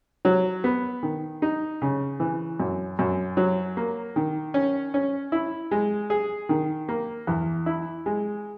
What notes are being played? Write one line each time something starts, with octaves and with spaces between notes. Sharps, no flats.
F#3
B3
D#3
D#4
C#3
E3
F#2
F#2
F#3
A#3
D#3
C#4
C#4
E4
G#3
G#4
D#3
A#3
E2
E4
G#3